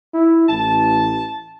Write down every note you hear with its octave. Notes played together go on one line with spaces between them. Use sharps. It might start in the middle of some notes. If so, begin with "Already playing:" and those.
E4
A1 A5